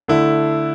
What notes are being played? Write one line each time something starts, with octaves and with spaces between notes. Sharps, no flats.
D3 A3 E4